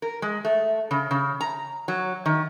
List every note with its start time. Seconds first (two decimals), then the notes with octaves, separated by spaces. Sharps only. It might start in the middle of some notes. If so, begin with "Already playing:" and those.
0.02 A#4
0.22 G#3
0.45 A3
0.91 C#3
1.11 C#3
1.41 A#5
1.88 F#3
2.26 D#3